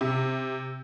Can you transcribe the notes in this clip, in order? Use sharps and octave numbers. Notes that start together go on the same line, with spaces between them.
C3